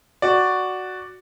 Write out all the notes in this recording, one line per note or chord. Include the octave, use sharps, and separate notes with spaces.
F#4 D5